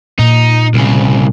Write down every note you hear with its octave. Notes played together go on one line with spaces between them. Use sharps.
A#2 D#4
C2 C#3